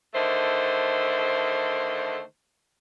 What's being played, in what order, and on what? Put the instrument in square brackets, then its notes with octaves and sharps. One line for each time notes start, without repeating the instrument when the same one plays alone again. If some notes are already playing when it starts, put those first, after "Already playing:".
[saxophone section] D3 D#3 A3 C5